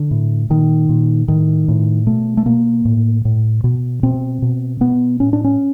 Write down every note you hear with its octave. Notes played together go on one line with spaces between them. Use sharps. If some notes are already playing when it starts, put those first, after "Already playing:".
Already playing: D3
A2
A#2 D#3
A#2
A2 D#3
A2
B2 A3
A3
B2 A#3
A2
A2
B2
B2 C4
B2
B2 B3
A2 C#4
D4
C#4